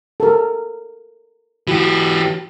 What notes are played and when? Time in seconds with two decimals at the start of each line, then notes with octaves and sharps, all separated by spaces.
0.20 A4 A#4
1.68 E3 F#4 G4